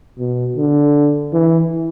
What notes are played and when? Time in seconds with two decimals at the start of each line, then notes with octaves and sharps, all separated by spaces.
0.18 B2
0.56 D3
1.33 E3